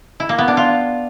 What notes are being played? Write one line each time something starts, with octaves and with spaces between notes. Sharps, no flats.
E4
A#3
B3
D4
F4